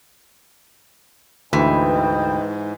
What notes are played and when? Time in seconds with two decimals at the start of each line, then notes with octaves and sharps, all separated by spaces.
1.53 D2 G#2 E3 B4 D#5 G5